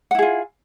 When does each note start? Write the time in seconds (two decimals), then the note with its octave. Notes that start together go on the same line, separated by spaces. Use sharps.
0.11 F#5
0.15 E4
0.19 G#4
0.22 F4